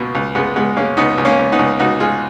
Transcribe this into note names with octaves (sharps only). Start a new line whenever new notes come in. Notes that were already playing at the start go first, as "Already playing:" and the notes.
Already playing: C#2 B2 A#3
C#2
C#2 G#3 B3
C#2 G#3 B3
G#3 A#3 C#4
C#2 B3 D#4
C#2
A#3 C#4
C#2
B3 D#4
C#2
C#2 D#4 F#4
G#3 F4 G#4